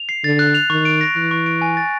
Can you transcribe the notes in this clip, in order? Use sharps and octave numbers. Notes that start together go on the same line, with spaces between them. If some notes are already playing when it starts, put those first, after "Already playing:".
Already playing: F7
C7
D3 A6
F#6
F7
D#3 C#6
D7
A#6
E3 F#6
C#6
D7
G#5
A6